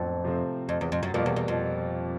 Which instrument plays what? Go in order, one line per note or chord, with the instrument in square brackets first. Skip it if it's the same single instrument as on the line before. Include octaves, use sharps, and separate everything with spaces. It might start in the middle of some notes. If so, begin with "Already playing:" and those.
Already playing: [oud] F2 [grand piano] A2 F#3 B3 D4
[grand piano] C3 F3 A3 C4
[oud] F2
E2
F2
F#2
[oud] F2 [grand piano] B2 G3 A#3
[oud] E2
E2
F2